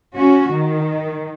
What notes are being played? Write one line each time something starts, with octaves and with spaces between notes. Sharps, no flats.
C#4 F#4
D#3